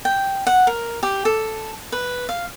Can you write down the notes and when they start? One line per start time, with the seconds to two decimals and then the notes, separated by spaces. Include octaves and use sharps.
0.05 G5
0.47 F#5
0.67 A#4
1.03 G4
1.25 A4
1.92 B4
2.29 F5